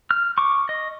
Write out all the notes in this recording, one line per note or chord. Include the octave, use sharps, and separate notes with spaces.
F6
C#6 D6
D#5